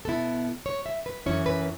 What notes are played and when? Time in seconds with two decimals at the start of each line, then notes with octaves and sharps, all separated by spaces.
0.05 B2 B3 E4 A4
0.66 C#5
0.86 E5
1.06 B4
1.26 F#2 E3 C#4 E4 C#5
1.46 B4